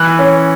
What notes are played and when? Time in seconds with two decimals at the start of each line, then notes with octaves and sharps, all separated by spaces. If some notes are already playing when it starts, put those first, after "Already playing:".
Already playing: E3 F#6
0.19 C#4